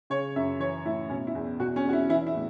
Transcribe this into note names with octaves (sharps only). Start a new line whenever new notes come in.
C#3 C#5
F#2 E5
E3 C#5
A2 E4
B2 C#4
E4
E2
B2 F#4
C#4
E2 F#4
E4
E3 E4
E4
A2